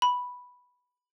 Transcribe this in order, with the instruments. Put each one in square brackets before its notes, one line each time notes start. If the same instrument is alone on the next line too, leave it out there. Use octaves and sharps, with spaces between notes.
[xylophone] B5